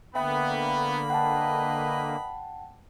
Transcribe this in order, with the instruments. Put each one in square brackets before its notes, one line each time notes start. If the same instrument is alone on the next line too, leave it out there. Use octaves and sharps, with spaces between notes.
[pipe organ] D3 A#3 [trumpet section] B3 [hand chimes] E5 G5 [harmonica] B5
[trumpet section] B4 D#5 [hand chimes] F#5 G5 A5